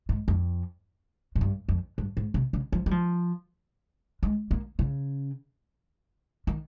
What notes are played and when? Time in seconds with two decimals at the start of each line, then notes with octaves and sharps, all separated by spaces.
0.09 G#2
0.28 F2
1.35 G#2
1.41 G2
1.69 F2
1.98 G2
2.17 G#2
2.34 C3
2.53 C#3
2.72 F3
2.86 G3
2.91 F3
4.23 G#3
4.51 A#3
4.79 C#3
6.47 D#3